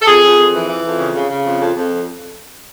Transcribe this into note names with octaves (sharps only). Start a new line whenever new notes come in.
A4
F2 G#4
F2
F2
E3
E3
F2
C#3
C#3
C#3
F2
F2
F2